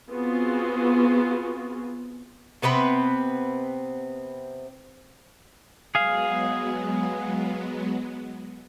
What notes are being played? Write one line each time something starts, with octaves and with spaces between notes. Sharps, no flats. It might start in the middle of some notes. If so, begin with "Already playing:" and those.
B3 C4 F4 F#4 G#4
C3 B3 C4 B4
F#3 G#3 B3 G#4 F5